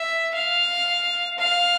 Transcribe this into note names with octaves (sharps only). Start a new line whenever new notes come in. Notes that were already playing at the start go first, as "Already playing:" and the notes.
Already playing: E5
F5
F5